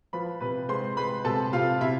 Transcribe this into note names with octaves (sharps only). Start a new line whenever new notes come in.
F3 B4 B5
C3 B4 B5
G#3 C5 C6
G#3 B4 B5
C3 A4 A5
C3 F4 F5
C3 E4 E5